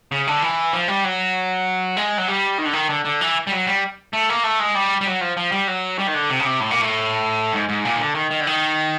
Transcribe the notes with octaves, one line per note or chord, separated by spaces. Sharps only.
C#3
D3
E3
F3
G3
F#3
G#3
F#3
G3
D#3
D3
D#3
D3
D3
E3
G3
F#3
G3
A3
A#3
A3
G#3
G3
G3
F#3
F3
F3
G3
F#3
G3
D#3
D3
C3
C#3
C3
A2
A#2
A2
G#2
G#2
A#2
D#3
D3
D#3
D#3
D3
D#3